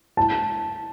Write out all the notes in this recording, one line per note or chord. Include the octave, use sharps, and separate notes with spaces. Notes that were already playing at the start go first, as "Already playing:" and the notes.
A5